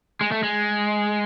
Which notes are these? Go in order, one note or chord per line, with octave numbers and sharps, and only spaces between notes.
G#3
A3
G#3